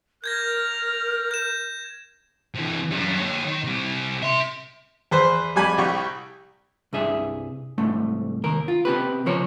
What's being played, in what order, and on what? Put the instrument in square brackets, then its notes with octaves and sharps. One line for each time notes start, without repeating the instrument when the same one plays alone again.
[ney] A#4 [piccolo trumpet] F6 [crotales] G6 G#6 A#6
[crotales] G6 E7
[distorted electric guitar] C3 E3
F#2 G3
A#3 C#5
D#3
C3 G3
E5 C6
[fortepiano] E2 B4 C5
F2 G3 G#5 B5 D6
C2 G3 G4 C#6
[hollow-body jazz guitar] C2 G2 G#4 E5
C2 G#2 A3
D#2 A#4
F4
C3 B3 G4 B4
C#2 F3 A#4 C#5